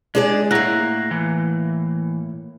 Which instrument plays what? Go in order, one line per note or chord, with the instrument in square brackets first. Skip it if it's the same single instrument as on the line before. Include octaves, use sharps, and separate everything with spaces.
[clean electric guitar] G#3 [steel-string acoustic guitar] D4 G#4 D5
[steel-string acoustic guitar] A2 A#3 [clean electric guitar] F#5 A#5
[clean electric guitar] E3